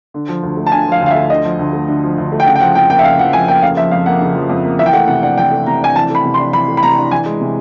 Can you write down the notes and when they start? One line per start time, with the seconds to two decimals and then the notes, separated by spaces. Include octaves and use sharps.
0.14 D3
0.28 F3
0.43 D2
0.57 A3
0.66 A5
0.72 D3 G#5
0.86 F3
0.92 F5
1.01 D2
1.06 F5
1.10 E5
1.15 A3
1.30 D3 D#5
1.45 F3
1.59 D2
1.73 A3
1.88 D3
2.03 F3
2.18 D2
2.32 A3
2.40 G5
2.46 C#3 F#5
2.56 G5
2.60 F3 F#5
2.75 F2 G5
2.90 A#3 G5
2.99 E5
3.04 C#3 F5
3.19 F3 F#5
3.33 F2 G#5
3.48 A#3 G5
3.62 C#3 F5
3.77 F3 E5
3.91 F2 F5
4.06 A#3 F#5
4.21 C#3
4.35 F3
4.50 F2
4.65 A#3
4.79 E3 E5
4.86 G5
4.93 A3 F#5
5.08 C3 F#5
5.23 D4 F#5
5.37 E3 G5
5.51 A3
5.66 C3 A#5
5.81 D4 G#5
5.96 E3 A5
6.10 A3 B5
6.25 C3
6.34 C6
6.39 D4
6.53 E3 B5
6.68 A3
6.77 B5
6.83 C3 A#5
6.97 D4
7.11 E3 G#5
7.26 G#3
7.41 C3